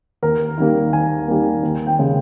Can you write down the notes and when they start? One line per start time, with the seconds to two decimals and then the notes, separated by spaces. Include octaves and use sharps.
0.22 D#2 A#4
0.58 D#3 G3 A#3
0.93 D#2 G#5
1.28 D#3 G3 A#3
1.63 D#2
1.87 G5
1.99 C#3 G#3